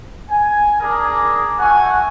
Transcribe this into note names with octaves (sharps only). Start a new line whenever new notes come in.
G#5
D4 G#4 A#4
A3 F#4 F#5 G#5